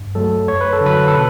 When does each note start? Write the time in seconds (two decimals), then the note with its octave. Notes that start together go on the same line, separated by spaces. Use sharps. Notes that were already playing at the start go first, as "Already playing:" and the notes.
Already playing: G2
0.15 F#3 A3 A4
0.48 F#2 C#5
0.61 B4
0.73 A4
0.81 D3
0.86 F#3 B4
1.08 A4
1.14 B2 B4